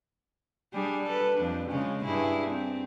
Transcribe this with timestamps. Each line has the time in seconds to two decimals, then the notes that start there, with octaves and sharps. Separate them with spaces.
0.73 G3 D4 G#4
1.06 A4 B4
1.37 F2 F3 D4
1.69 C#3 G#3 C#4
2.05 G2 E4 G#4
2.51 C4